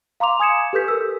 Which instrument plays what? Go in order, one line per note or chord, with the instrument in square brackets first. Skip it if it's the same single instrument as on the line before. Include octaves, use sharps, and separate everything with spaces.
[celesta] F5 A#5 C6 D6 F7
G#5 D#6 G#6 C#7 E7
G4 A4 B4 G6 B6
A#4 E6